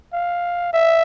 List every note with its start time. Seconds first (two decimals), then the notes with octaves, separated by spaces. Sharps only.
0.13 F5
0.73 E5